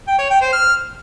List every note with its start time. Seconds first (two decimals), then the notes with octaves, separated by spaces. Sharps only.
0.07 G5
0.19 C#5
0.30 G5
0.41 C5
0.52 F6